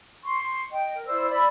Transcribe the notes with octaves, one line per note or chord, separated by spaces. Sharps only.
C6 C#6
D#5 G5
A#4
E4 C5 D5 E6
D5 B5 E6